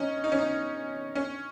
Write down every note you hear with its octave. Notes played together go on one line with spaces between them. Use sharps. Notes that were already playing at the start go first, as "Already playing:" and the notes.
Already playing: C#4 D#4
D#4
C#4
D#4
C#4